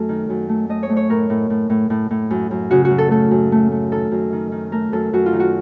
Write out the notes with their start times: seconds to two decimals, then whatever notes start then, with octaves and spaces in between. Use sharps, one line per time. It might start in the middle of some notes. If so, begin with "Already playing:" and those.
Already playing: F#2 A3 A4
0.09 D#3
0.30 F#2
0.49 A3
0.69 A3 D#5
0.83 C#5
0.90 A3
0.97 C#5
1.09 A2 A#4
1.30 A2
1.50 A2
1.70 A2
1.90 A2
2.11 A2
2.30 F#2
2.51 F#2
2.71 C#3 F#4
2.85 F#4
2.91 F#2
2.98 A4
3.11 A3 A4
3.31 F#2
3.52 A3
3.72 A3
3.91 D#3 A4
4.12 F#2
4.32 D#3
4.52 D#3
4.72 A3 A#4
4.92 F#2 A4
5.13 F#2 F#4
5.26 F4
5.33 D#3
5.40 F#4